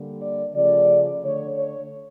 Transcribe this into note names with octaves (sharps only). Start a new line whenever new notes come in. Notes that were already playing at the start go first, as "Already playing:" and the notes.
Already playing: D3 G3 A#3
D5
C#3 F3 A3 D5
D3 A3 C#5
C#5